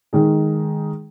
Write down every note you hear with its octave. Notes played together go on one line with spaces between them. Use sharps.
D#3 G#3 D#4 G#4